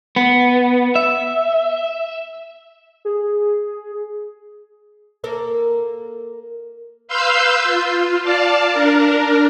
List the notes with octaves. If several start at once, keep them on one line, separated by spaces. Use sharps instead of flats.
B3
E5
G#4
A#3 A4 A#4
B4 F5 C6 E6 G6
F4
D5 F5 A5
D4 A#4